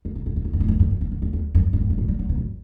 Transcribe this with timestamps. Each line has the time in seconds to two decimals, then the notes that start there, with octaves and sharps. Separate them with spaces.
0.05 F#2
0.15 F#2
0.26 E2
0.36 F#2
0.45 E2
0.53 F#2
0.60 A2
0.68 G2
0.80 F#2
0.91 F#2
1.01 E2
1.12 F#2
1.22 E2
1.33 E2
1.55 F#2
1.73 G2
1.81 F#2
1.90 G2
1.98 A2
2.08 G3
2.19 F#3
2.29 B2
2.38 G2